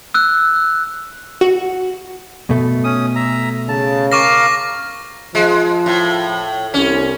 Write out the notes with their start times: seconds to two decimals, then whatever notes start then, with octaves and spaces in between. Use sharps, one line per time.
0.14 E6 F#6
1.41 F#4
2.50 B2 A3
2.84 C#4 D#6
3.16 E5 A#5
3.69 C#3 A5
4.12 A#4 F5 C#6 D6 A#6
5.35 F3 G#3
5.86 A2
6.74 C2 C#4